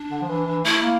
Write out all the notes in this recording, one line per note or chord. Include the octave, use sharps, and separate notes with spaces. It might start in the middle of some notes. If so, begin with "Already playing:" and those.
Already playing: D4
D3
F3
E3
E3
A3 E4
A#3